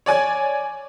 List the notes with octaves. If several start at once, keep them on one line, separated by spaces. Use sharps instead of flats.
C#5 D5 G#5 G#6